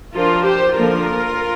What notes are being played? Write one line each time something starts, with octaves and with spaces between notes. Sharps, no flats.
F3 D4 F4 A#4
G4 C5
D3 F3 A#3 D4 F4 A#4